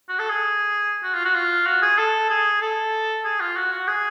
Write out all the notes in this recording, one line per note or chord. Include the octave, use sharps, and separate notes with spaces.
F#4
A4
G#4
F#4
F4
F#4
F4
F#4
G#4
A4
G#4
A4
G#4
F4
F#4
F#4
G#4